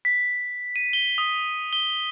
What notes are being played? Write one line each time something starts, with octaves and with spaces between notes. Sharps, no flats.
B6
D#7
G7
D#6
G7